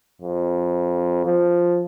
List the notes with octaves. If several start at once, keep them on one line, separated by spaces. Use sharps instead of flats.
F2
F3